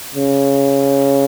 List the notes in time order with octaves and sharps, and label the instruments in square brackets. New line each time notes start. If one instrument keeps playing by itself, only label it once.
[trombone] C#3